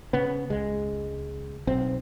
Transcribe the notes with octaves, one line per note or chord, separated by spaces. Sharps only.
C#3 B3
C#2 G#3
B1 C4